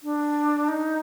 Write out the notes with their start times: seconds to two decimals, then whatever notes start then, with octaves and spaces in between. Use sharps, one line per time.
0.03 D4
0.68 D#4